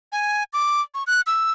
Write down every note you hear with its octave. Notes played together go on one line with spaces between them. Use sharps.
G#5
D6
C#6
F#6
E6